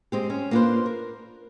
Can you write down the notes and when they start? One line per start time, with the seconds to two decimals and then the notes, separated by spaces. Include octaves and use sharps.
0.12 G#3 C4 G4
0.30 C#4
0.51 A#3 D4 F4 A4 B4 C5
0.86 A#4